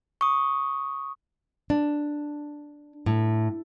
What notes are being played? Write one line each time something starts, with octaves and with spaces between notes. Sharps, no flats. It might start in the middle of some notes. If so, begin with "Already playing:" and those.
C#6 D#6
D4
A2